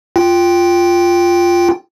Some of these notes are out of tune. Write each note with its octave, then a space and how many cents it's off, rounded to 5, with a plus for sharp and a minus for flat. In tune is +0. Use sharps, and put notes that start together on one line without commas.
F4 +0 G5 +0